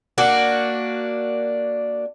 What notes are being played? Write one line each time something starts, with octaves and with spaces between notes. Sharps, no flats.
A#3 D4 F#4